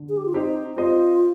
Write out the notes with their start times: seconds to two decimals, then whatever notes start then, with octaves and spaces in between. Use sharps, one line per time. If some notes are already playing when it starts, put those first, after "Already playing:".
Already playing: D3
0.09 G#4
0.17 G4
0.25 F4
0.33 C4 D#4 G4 C5 D#5
0.76 C4 F4 G4 C5 D#5